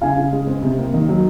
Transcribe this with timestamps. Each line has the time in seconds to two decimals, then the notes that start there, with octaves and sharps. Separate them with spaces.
0.01 C#3 F5 G#5
0.17 C#3
0.33 G#3
0.47 C4
0.63 C3
0.78 A#3
0.94 D#3
1.09 F#3